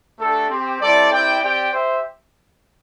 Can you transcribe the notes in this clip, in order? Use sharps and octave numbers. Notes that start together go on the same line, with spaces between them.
A3 D4 G4 A4
C4 G4
G3 C4 E4 A4 D5
C4 E4 G4 D5 G5
C4 G4 D5 G5
G4 C5 E5